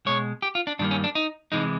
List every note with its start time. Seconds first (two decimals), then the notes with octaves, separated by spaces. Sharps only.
0.06 B2 G#3 C#5
0.42 G4
0.55 F4
0.67 D4
0.79 G2 D#3 G3 A#3 D4
0.91 C#4
1.04 D4
1.15 D#4
1.52 C3 E3 G#3 D#4